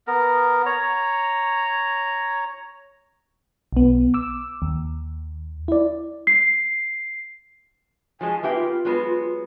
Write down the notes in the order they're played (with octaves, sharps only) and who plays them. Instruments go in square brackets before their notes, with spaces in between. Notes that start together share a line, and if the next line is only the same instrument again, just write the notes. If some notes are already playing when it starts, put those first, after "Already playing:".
[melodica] B3 A#4
C#5 A#5
[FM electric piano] B1 B3
D6 E6
D#2
E4 D5
[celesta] C7
[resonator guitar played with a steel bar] F3 F#3 G#3 [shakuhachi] G#5
[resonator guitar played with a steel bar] A#3 B3 G4 [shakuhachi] E5
[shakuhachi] F4
[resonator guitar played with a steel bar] F#3 G#3 B3